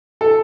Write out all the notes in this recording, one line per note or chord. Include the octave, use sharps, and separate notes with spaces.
A4